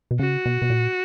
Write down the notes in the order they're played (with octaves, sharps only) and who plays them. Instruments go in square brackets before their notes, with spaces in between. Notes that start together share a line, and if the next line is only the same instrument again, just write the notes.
[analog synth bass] B2
[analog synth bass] C#3 [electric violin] F#4
[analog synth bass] B2
B2
A#2